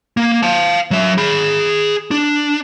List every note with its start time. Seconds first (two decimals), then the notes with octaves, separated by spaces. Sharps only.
0.17 A#3
0.43 F5 A5
0.91 F#3 E5
1.18 G#4 B5
2.11 D4